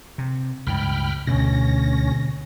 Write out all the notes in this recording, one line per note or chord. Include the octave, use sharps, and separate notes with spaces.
C3
C#2 G2 G5 B5 F6
D2 B2 D3 A3 C#4 A#6